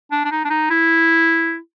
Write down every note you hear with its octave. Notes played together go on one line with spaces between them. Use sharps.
D4
D4
D#4
D4
D#4
E4